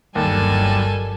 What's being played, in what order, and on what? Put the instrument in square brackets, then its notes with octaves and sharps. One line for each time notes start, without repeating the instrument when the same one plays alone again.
[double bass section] G1 F#3 [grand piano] D#2 [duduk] G3 [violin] A4 G#5